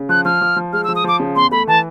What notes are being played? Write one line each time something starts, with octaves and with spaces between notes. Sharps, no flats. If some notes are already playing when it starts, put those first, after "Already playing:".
Already playing: C#3
F3 F#6
F3 F6
F3
F3
G#3 F6
E6
F3
D#6
F3 D6
C#3
E2 C6
A3 B5
E3 A5